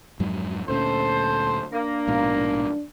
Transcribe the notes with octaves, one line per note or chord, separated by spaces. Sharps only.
F2 G#2 F#3
D2 A#2 C#4 A4 C5
A#3 D4
A#1 G#2 B2